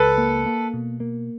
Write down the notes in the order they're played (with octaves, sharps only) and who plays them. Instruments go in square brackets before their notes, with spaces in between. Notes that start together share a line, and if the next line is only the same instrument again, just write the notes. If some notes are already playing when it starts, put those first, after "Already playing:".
Already playing: [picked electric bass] C#2 [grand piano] A4 B4
[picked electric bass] A#3
A#3
B2
A#3